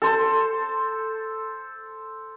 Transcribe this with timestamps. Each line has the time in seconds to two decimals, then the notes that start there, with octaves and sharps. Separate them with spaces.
0.02 A4 C5